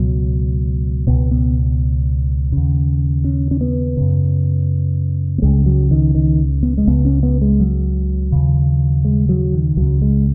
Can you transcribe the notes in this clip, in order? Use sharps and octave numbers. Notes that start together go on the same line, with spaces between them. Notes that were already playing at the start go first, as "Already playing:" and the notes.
Already playing: C#2 B2 F#3
C#2 B2 B3
B3
D#2 C#3
C#4
C#4
B3
F#2 C#3
B3
C#2 C#3 G#3
F#3
D#3
D#3
B3
G#3
C#2 C#3 B3
C#4
B3
G#3
F#3
D#2 C#3
G#3
F#3
D#3
C#2 C#3 F#3
G#3